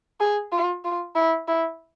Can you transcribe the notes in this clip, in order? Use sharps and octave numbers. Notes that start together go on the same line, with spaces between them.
G#4
F4
F4
E4
E4